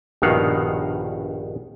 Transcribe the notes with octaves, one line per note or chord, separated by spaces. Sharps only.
A#1 G2 B2 D#3 F5 F#5